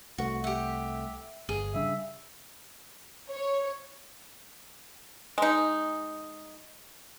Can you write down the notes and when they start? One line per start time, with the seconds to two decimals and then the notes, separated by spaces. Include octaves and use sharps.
0.18 C2 A3 F#4
0.44 G4 E5 F#5
1.49 G1 G#4
1.74 C#3 G3 D4 E5
3.29 C#5
5.38 G#3 D#4